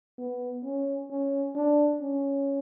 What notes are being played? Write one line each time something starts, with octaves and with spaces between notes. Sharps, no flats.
B3
C#4
C#4
D4
C#4